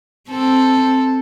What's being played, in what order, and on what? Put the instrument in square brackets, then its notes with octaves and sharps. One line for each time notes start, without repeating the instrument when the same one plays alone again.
[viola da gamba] C4 [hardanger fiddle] A4